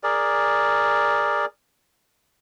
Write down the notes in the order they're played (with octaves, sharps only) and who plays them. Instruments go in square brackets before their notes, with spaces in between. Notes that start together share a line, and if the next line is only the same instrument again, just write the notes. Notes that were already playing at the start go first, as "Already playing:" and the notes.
[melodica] G#4 A#4 D5